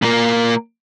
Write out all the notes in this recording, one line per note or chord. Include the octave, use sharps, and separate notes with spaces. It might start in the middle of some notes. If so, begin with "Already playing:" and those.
A#2 A#3